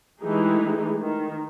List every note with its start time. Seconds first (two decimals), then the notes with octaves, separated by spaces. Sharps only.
0.20 E3 G#3 A3 D#4 G4 G#4
0.99 D#3